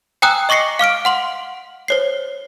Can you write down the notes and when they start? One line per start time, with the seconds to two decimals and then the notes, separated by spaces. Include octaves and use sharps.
0.22 G5 G#5 A#5 D#6 E6 F#6
0.49 D#5 C#6 D6 A#6 C7 C#7
0.79 F5 D6 F6 D7
1.05 F#5 C6 F#7
1.88 C5 C#5 C7